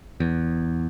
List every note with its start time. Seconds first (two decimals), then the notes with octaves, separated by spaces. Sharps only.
0.20 E2